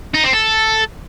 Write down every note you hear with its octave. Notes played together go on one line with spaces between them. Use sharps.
D#4
C4
A4